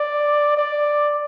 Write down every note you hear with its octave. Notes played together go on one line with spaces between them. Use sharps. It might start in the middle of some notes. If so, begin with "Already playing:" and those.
Already playing: D5
D5